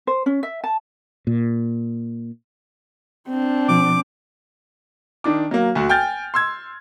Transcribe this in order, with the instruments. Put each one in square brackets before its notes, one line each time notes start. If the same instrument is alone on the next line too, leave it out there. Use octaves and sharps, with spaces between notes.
[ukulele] C5
C#4
E5
A5
[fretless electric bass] A#2
[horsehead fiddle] C4 D4
[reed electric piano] B2 F3 [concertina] D6
[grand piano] D#3 D4 D6
F#3 A#3
D2 F#4
G5 G#5 F6 G6 A6
C6 E6 G#6